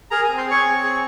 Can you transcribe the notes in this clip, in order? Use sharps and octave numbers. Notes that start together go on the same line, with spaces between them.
G#4 A#4 A#5
C4 G#4 G#5
C5 C6
G#4 C#5 C#6
C4
G#4